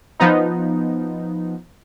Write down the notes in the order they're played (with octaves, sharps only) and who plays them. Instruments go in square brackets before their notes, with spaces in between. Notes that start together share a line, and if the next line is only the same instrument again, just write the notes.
[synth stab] F3 B3 D#4